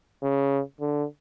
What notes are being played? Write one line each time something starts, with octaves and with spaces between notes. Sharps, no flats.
C#3
D3